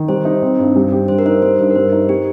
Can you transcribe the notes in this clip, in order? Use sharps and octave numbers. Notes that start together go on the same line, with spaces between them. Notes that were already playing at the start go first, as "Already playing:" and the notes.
Already playing: D#3
G3 C5
D#4
C4
G2
G3
G4
G2 C5
A#4
D#4 C5
G3 C5
G2 C5
A#4
G3 C5
D#4
G3 G4